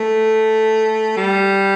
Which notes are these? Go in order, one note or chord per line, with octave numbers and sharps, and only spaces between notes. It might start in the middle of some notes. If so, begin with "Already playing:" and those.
Already playing: A3
G3